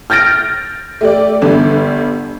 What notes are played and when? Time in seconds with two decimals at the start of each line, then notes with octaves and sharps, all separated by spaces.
0.10 F6 G6 A6 A#6 D7
1.01 A3 G4 D5
1.42 G1 D3 G3